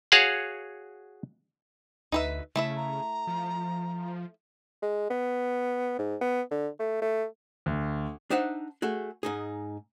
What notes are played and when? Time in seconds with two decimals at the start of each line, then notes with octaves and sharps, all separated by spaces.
0.12 F#4 G#4 C#5 F5 F#5
2.12 D2 D#4 B4 E5
2.56 C#3 A3 E4 E5
2.77 A#5
3.27 F3
4.83 G#3
5.10 B3
5.99 G#2
6.21 B3
6.51 D3
6.80 A3
7.02 A3
7.66 D2
8.30 D4 D#4 C5 E5 F#5
8.82 A3 F#4 G#4
9.23 G#2 D#4 G#4